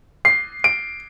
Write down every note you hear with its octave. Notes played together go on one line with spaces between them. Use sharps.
C7
D7